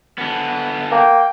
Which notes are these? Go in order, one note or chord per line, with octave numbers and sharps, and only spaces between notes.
D3 B3
A#3 G5